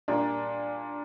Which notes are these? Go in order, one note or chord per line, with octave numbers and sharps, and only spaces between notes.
A#2 G3 A#3 D4